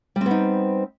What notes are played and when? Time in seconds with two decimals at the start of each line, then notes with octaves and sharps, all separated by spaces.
0.16 G3
0.21 C4
0.26 B3
0.31 D#4